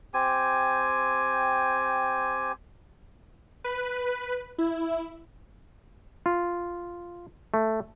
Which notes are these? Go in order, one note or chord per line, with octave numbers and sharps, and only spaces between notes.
C4 G4 G#5
B4
E4
F4
A3